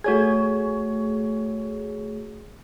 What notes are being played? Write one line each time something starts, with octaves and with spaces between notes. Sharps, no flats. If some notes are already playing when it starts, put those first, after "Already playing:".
A3 F#4 G#4 C#5 G#6